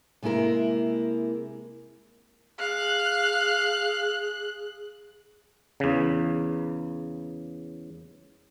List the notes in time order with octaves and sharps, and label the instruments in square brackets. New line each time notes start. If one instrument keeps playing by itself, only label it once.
[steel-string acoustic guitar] C3 G#3 A#3 E4 A#4
[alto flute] G#4 [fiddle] F5 [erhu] F#6
[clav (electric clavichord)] E2 C#3